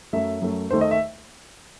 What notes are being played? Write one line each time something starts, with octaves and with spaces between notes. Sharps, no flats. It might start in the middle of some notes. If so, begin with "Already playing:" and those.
F#2 F#3 A3 E5
F#2 F#3 A3
D#2 D#3 A3 C5
D#5
E5